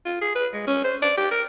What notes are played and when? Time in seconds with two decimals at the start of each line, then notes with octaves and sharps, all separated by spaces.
0.06 F4
0.21 G#4
0.35 B4
0.53 G#3
0.67 C#4
0.84 C5
1.02 D5
1.17 G4
1.31 A#4